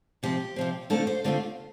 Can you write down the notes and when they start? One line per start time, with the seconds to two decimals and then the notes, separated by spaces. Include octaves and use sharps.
0.23 C3 F3 C4 G4
0.56 C3 F3 C4
0.90 D3 A3 C4 F4 A4
1.07 C5
1.24 D3 A3 C4 F4